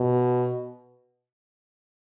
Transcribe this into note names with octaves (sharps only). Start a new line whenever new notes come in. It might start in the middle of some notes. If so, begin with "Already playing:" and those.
Already playing: B2